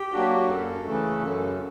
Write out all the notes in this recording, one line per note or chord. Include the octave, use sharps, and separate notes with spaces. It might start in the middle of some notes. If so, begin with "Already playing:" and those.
Already playing: G4
F#3 A#3 D4 F#4
F#2 A4
C#3 E3 A3
F#2